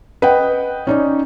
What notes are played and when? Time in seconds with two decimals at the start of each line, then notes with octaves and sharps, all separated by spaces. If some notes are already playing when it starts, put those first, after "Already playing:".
0.22 B4 D#5 F#5 G5
0.87 C#4 D#4 D5